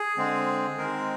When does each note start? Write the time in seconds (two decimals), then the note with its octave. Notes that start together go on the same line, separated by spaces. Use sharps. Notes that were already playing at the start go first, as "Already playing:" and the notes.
Already playing: G#4
0.17 D3 G#3 C4
0.77 D#3 G#3 C4 A#4